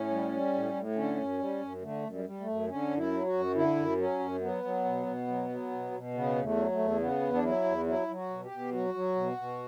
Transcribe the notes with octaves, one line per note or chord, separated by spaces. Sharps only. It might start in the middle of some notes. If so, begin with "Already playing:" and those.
Already playing: A2 C#4
G3
G3
A2
A2
D3 C#4
F#2
G3
F#2
D3 A3
F#2
G3
G3
A3
F#2
D3 C#4
F#2
E4
F#3
F#4
F#2
D3 E4
F#2
F#3 C#4
F#2
F#3 B3
F#3
B2
B2
F#3
F#3
B2
B2
C#3 B3
E2
A3
F#3
A3
E2
C#3 B3
E2
D4
F#3 E4
E2
F#3 E4
F#3
F#4
B2
G4
B2
F#3 F#4
F#3
B2
B2